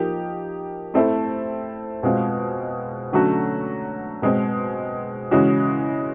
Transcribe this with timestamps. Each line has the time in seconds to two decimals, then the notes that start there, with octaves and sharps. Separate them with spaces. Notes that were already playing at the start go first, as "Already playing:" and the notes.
Already playing: F3 A#3 D#4 G4
0.94 A3 C4 E4 A4
2.03 B2 G#3 C4 F4
3.13 D3 F#3 A3 C#4 F#4
4.22 B2 G#3 C4
5.31 C#3 E3 G#3 C#4 F#4